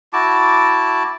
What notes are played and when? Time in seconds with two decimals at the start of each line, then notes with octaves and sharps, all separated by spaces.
0.13 E4 F#4 A5 D6